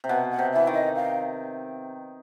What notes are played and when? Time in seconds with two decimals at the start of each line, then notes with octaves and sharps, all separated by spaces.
0.04 C3
0.09 B2 F#5
0.31 F#5
0.39 C3
0.53 E3 E5
0.67 D#3
0.74 D#5
0.96 F5